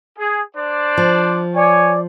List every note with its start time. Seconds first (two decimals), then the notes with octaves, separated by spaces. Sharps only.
0.19 G#4
0.56 D4 C5 D5
0.98 F3
1.55 C#5 D5 G#5